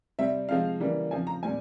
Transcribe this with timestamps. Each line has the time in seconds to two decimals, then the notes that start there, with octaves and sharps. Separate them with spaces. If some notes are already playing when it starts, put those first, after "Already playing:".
0.19 C3 G3 C4 E5
0.49 C3 F3 G#3 C4 F5
0.80 C#3 E3 G3 A#3
1.11 C#3 F3 C4 G#5
1.27 A#5
1.43 A#2 G3 C4 G#5